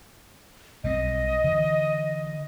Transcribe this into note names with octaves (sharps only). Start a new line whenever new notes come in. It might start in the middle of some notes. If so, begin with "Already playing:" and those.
B1 G3 C4 D#5
D3 E3